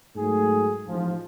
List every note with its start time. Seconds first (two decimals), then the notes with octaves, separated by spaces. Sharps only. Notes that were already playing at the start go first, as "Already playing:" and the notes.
0.16 G#2 F#3 A3 G#4
0.86 A1 G#2 F3